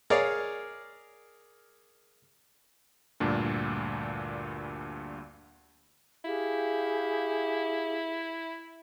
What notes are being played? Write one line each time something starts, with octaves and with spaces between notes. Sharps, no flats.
G#4 A#4 C#5 D5 F5
D2 G2 A#2 D4
E4 G4 G#4 F5